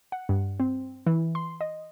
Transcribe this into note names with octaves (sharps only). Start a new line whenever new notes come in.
F#5
G2
C4
E3
C6
D#5